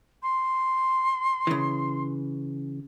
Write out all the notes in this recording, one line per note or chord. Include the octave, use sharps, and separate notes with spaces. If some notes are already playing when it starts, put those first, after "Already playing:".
C6
C#3 E3